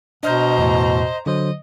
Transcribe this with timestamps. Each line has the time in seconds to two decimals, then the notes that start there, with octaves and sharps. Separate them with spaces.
0.23 B2 D4 C5 D#5 A#5 F6 G6
0.58 E2 A2
1.26 D3 F#3 C5 D#5